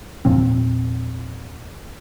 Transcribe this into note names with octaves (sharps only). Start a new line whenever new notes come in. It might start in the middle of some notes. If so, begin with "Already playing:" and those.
E2 A#2 F3 C4